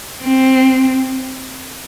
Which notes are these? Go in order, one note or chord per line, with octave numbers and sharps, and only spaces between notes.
C4